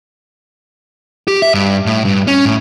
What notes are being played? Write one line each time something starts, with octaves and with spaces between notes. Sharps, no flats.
G4
E5
G2
A2
G2
C#4
A2